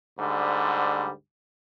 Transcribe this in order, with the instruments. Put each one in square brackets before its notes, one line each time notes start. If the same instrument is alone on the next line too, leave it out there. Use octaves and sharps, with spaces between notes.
[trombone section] D2 G#2 D3 G3